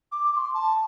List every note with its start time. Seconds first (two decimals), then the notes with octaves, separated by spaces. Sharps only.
0.12 D6
0.33 D6
0.37 C6
0.54 A5